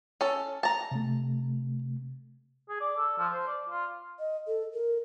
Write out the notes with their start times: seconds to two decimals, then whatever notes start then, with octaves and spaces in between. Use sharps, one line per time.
0.21 C#4 A4
0.63 A5 A#5
0.91 C3 A3
2.69 G#4
2.80 D5
2.98 A4
3.18 F3
3.33 C5
3.47 D5
3.70 F4
4.19 D#5
4.47 A4
4.73 A#4